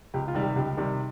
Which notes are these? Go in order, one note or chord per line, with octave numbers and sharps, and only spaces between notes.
C#2 G4
F4
C3 D#3 G3
G4
C#2 G4
C3 D#3 G3